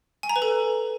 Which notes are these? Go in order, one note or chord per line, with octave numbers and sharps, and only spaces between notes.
G#5
A#5
B4
A4